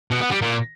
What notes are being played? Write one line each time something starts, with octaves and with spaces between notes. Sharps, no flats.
B2
B3
G3
A#2